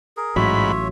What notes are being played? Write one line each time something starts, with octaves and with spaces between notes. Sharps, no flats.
G#4 A#4
A1 G#2 F#3 F4 C#5 E5 B5